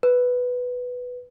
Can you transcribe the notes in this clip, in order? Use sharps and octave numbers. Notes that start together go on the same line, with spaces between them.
B4